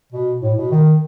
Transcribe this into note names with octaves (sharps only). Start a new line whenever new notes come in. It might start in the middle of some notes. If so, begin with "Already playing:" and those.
B2
A2
B2
D#3